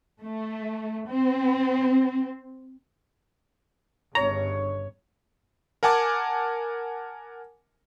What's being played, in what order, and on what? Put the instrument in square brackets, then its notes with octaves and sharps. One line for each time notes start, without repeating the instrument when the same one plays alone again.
[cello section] A3
C4
[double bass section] G1 G2 C#3 [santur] C#5 [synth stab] A#5
[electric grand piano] A#4 F#5 G#5 A5 D6